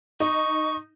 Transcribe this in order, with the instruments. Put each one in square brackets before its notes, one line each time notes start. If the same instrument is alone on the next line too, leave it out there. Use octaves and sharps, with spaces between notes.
[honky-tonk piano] D#4 [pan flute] C#6